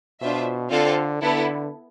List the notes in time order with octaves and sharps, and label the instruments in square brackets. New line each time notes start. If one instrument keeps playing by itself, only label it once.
[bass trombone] B2 [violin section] D4 F4 C5 E5
[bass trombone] D3 [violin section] C4 F4 A4 D5 F5
[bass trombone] D3 [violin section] B3 E4 A4